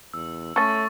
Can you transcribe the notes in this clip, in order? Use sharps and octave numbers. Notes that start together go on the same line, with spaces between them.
E2 E6
A3 C#4 A4 C#6 A6